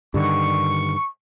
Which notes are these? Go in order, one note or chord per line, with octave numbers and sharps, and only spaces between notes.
G2 D3 D#3 C#6